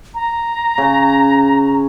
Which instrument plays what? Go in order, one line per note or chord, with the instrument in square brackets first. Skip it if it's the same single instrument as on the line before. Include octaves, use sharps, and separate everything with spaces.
[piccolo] A#5
[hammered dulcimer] C#3